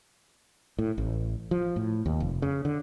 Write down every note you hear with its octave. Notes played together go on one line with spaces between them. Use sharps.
A2
A1
F3
A2
D#2
F1
C#3
D3